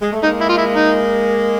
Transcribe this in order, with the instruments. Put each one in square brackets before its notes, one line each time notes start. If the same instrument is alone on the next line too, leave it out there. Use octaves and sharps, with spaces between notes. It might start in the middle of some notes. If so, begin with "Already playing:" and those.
[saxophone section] G#3
A3
[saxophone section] G#3 A#3 [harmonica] D#4
[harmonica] E4
F4
E4
D#4